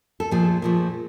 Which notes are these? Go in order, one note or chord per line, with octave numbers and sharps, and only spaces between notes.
A4
A#2 F3 A3 G#4
A#2 F3 A3